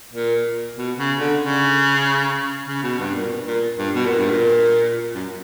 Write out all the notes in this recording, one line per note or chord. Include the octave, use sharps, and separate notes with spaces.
A#2
B2
C#3
D3
C#3
C#3
B2
G2
A#2
A#2
G2
B2
A#2
G2
A#2
F#2